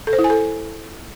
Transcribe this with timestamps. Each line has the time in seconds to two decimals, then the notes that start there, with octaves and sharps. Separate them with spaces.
0.07 A4
0.13 C5
0.19 E4
0.24 G#5
0.30 A4